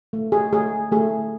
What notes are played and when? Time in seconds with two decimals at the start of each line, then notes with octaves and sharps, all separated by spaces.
0.13 A3
0.32 G#4
0.53 A3 G#4
0.92 A3 G#4